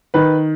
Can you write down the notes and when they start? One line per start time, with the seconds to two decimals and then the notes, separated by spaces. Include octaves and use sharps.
0.14 D#3 B4